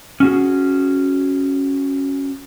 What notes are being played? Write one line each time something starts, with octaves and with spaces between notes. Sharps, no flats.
C#4 F#4 G#4